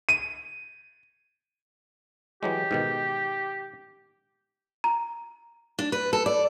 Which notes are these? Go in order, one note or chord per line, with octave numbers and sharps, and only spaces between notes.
D#7
E3 F#3 G#3 G4
G#2 B2 D#3
A#5
D4
B4
A4
D5